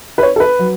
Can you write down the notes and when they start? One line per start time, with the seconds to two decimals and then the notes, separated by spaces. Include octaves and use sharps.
0.18 B4
0.23 C#5
0.36 A4
0.40 B4
0.59 F#3